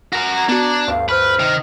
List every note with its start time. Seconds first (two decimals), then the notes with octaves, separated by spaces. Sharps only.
0.13 F#4 A#4
0.34 A#5 G#6
0.49 B3 D4 F#4
0.88 D2 G2 F5
1.09 B4 C5 F6
1.39 C3 D#3